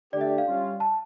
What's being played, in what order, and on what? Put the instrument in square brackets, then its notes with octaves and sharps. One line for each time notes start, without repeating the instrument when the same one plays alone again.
[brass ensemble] D3 A3 D4 G4 [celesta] D5
[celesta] E5
F5
[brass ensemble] G3 C#4 F4
[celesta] A5